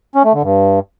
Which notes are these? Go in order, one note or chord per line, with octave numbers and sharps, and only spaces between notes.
C#4
A3
D3
G2